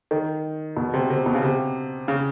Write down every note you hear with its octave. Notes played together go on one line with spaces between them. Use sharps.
D#3
B2
C3
C3
B2
C#3
C3
C#3